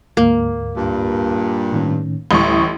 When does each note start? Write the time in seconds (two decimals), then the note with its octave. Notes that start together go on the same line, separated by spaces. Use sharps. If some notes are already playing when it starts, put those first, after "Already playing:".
0.17 D2 G#2 A#3
0.76 G2 A#2
1.72 A2 D#3 C#4
2.31 A1 D2 A2 G3 C#6 D#6